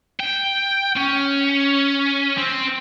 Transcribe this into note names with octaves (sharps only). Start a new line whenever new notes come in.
G5
C#4
C4